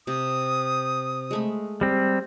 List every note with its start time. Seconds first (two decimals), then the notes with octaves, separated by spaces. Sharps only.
0.07 C3 D#6
1.31 G#3 A3 B5
1.81 G3 C4